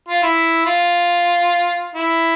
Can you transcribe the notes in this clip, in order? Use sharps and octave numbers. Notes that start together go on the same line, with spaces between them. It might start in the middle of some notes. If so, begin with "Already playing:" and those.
F4
E4
F4
E4